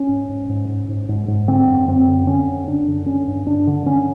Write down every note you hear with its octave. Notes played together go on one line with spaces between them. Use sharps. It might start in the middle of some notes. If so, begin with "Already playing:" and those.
Already playing: C#4
G#2
G#2
G#2
G#2
G#2
G#2
G#2
D3 C4
F#2
F#2 C4
D3
D3 C#4
F#2
F#2 D4
D3
D3 C#4
G2
G2 D4
D3
D3 C#4